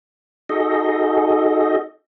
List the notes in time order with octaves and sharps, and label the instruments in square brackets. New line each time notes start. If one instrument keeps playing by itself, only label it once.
[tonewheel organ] D#4 F#4 G#4 A4 D#5